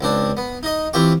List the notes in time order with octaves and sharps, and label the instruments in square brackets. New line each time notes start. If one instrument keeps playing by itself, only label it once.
[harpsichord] C#2 C4 D4
B3
D#4 D#5
E3 C4 F4 G4 C#6